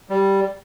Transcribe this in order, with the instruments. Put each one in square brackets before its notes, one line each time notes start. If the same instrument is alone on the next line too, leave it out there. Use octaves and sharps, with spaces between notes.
[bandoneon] G3